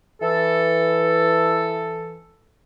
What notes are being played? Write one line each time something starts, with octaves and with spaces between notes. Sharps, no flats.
E3 A4